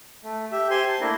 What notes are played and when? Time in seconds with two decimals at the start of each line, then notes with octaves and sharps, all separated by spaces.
0.24 A3
0.52 G4 E5
0.70 G4 C5 G#5 C6
0.88 A5
1.01 A3 A#3 D4 E4 A#4